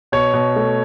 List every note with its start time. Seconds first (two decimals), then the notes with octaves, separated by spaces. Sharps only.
0.12 B2 C#5
0.33 B2
0.56 A3